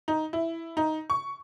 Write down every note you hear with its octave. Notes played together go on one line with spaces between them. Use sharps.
D#4
E4
D#4
C#6